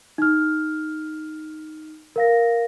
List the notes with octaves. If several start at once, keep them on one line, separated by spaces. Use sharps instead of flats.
D#4 F6
A#4 F5 A#6